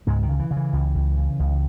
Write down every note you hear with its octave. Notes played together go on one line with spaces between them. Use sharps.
C#2 G#2 G#3
D#3
C#3
E3
C#3
E3
C#2
C#2
C#3
C#2